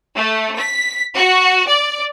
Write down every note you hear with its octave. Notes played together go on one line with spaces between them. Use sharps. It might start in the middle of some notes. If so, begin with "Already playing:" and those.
A3
B6
F#4
D5